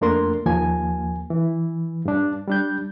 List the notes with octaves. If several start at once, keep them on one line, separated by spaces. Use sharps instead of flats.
F2 A3 A#3 D4 A#4 C6
D#2 F3 A#3 G#5
E3
G2 D4
G3 D4 G6